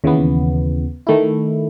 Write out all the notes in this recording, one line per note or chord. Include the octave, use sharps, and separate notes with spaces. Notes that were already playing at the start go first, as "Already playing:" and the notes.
D#2 C#3 E3 B3
D#3 A3 E4